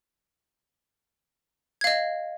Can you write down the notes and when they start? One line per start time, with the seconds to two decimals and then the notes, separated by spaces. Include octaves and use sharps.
1.81 G#6
1.84 F5
1.87 D#5